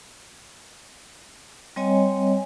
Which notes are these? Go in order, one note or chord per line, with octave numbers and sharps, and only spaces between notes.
G3 C4 C#5 D#5 G#5